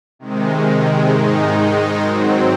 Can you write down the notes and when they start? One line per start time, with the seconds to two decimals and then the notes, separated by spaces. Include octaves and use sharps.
0.19 C3 D#3 G#3
1.10 G#2 D#3 G#3 D#4
2.01 G#2 F#3 C4